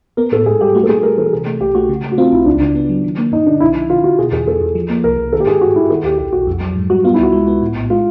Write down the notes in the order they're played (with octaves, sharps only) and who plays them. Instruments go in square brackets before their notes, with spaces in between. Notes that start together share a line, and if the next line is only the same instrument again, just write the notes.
[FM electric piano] B3 [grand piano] A#4
[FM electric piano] A2 [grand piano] A4
[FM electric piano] G#2 [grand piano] G#4
[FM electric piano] G3 [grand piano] G4
[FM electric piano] A3 [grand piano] F#4
[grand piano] A4
[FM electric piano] A3 [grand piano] G#4
[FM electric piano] G3 [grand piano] A#4
[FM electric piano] E3 [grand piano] A4
[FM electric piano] C3 [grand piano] G#4
[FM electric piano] A3
[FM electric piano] B1 [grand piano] G4
[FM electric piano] A3 [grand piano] F#4
[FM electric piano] C#3
A3
[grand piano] F#4
[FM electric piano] C4 [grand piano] F4
[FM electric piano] B1 [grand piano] E4
[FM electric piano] C#2 [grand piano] D4
[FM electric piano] C#3
B3
F#3
D#3
A#3
[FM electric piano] G2 [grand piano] D#4
[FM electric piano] D3 [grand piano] D4
[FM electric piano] B1 [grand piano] E4
[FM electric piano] F3
[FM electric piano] D3 [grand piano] F4
[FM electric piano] D3 [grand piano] F#4
[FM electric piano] B2 [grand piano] G#4
[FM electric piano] E2 [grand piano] G#4
[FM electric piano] E2 [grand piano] A4
[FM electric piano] E2
F3
A#3
[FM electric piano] C2 [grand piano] A#4
[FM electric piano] C2
[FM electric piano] D#3 [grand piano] A4
[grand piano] G4
[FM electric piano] G#2 [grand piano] G#4
[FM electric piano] G2 [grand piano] F#4
[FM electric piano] G2 [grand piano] E4
[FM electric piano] D#3 [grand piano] A4
[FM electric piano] D#2 [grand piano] G4
[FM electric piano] B1 [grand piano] G4
[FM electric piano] B1 [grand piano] F#4
[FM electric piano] F2
F#3
G#2
[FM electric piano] G3 [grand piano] F#4
[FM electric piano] B3 [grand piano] F4
[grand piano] E4
[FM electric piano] C#2 [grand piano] F#4
[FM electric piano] G#3
B3
A2
A#1
[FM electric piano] G#3 [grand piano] F4